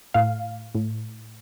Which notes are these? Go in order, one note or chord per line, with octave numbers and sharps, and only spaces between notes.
A2 F5
A2